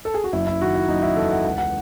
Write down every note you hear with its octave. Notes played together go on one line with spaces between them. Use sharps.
A4
G#4
F#4
F#1 E4
E4
D#3 F#4
E4
F#1 D#4
E4
E2 A4
F#5
C#2 F#5
F#5